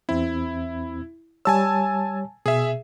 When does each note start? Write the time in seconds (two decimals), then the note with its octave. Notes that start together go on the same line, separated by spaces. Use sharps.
0.09 E2 C4 E4
1.45 G3 C#5 G#5 A5 E6
2.46 B2 G#4 E5